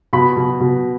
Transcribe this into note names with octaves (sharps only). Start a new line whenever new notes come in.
B2 B5
B2
B2